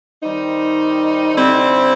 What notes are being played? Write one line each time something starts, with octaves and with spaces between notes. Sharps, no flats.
D#3 G3 C4 D#4
D3 G3 C4 E4